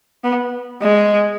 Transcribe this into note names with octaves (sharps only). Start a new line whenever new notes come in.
B3
G#3